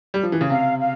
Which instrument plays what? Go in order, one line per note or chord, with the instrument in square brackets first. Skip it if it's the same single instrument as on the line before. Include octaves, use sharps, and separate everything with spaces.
[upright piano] G3
F3
E3
C#3
[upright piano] C3 [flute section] F5
[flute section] F5